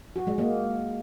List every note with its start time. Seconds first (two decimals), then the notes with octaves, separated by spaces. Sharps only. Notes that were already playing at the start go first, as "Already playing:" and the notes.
0.16 F#4
0.27 G#3
0.38 A#3